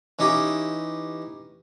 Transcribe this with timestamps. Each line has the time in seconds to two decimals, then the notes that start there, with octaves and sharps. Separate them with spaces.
0.19 E3 C#4 D#4 G4